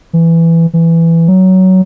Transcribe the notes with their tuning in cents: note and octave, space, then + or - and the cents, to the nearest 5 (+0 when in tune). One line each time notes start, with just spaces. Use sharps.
E3 +10
E3 +10
F#3 +15